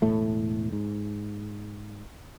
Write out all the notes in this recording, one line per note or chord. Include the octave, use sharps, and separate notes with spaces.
E1 A2 A3
G#2